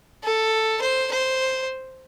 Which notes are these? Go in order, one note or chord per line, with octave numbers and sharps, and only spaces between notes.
A4
C5
C5